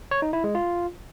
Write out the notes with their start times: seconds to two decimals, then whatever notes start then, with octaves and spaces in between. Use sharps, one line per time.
0.11 C#5
0.22 D#4
0.33 E4
0.44 G#3
0.55 F4